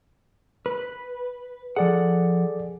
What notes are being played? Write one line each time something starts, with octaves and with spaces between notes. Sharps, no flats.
B4
F3 G#4 A4 D5 F#5